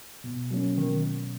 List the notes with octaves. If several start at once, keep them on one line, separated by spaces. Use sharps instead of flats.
B2
F#3 A#3 C#4
B2 D#3